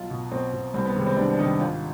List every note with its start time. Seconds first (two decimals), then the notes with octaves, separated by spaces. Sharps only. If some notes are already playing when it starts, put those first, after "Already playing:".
Already playing: B1 F4
0.10 B2
0.32 B1 C4
0.53 B2
0.74 C2 C4
0.85 B3
0.95 C3 D#3 G#3
1.06 C4
1.17 C2 D4
1.33 D4
1.38 C3 D#3 D#4
1.60 G#1 F4